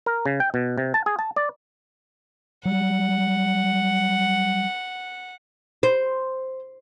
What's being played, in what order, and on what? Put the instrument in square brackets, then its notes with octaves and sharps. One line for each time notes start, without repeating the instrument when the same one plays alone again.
[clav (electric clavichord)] A#4
C#3
G5
B2
C3
A5
G#4
A5
D5
[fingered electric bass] F#3 G3 [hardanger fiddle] F#5
[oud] C5